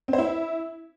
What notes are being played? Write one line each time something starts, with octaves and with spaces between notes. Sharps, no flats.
C4
C5
E4